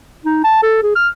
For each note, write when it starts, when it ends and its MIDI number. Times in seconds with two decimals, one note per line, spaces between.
0.25 0.42 63
0.44 0.59 81
0.63 0.79 69
0.83 0.94 68
0.95 1.08 89